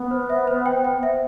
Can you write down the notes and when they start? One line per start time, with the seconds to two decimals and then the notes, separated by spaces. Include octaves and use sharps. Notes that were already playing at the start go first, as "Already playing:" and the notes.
Already playing: B3
0.11 C5
0.30 E5
0.47 C5
0.66 G5
0.85 C5
1.03 E5